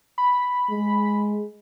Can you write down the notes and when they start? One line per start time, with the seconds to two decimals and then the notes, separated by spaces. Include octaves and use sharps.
0.18 B5
0.70 G#3